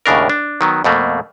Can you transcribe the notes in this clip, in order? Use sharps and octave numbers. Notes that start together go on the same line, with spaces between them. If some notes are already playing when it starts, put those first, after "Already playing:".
D#2 A2 C#3 D4 A#4
D4
D#3 F#3 B3
F2 B2 A3 A#3